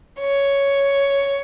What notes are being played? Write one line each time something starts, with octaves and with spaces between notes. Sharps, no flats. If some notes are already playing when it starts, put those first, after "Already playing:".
C#5